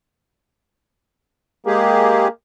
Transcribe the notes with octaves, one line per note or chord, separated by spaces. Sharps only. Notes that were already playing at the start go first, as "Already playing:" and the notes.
G#3 A#3 G4 G#4